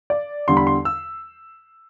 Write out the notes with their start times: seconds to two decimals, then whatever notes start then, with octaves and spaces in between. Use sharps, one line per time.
0.10 D5
0.48 E2 D3 G3 C6
0.57 B5
0.67 C6
0.85 E6